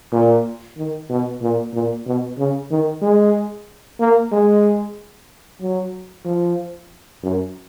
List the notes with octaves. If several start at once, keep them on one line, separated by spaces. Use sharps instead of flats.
A#2
D#3
B2
A#2
A#2
B2
C#3
D#3
G#3
A#3
G#3
F#3
F3
F#2